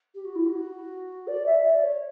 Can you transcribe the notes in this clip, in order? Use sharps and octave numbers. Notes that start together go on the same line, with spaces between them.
G4
F#4
E4
G4
F#4
D5
E5
D5
C#5